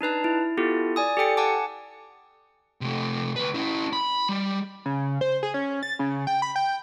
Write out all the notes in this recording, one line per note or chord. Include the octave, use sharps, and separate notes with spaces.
D4 D#4 B4 A5
E4
B3 E4 F4 G4 A4
D5 G#5 D#6
G4 A4 G5 C#7
F#5 G#5 A5 D6
C3 A3
D2 B4
C#4 E4
B5
G3
C#3
C5
G#4
C#4
A6
C#3
G5
B5
G5